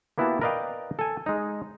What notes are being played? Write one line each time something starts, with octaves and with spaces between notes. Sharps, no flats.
A#3 B3 E4 F#4 G4 A5
A#4 B4 D5 D#5 F5 G5
A4 G#5
G#3 D#4